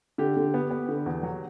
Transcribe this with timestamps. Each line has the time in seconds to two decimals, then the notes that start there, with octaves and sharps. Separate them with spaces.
0.18 D3 G4
0.37 D3
0.54 B3
0.70 B3
0.89 D3
1.06 E2
1.23 F#3